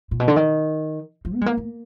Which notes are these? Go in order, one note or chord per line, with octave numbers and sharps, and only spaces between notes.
A#2
B2
D3
D#3
F3
B3
G#3
A#3
A#3